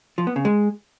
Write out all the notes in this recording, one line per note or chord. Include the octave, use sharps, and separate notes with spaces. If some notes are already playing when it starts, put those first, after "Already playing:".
F3
B3
C#3
G#3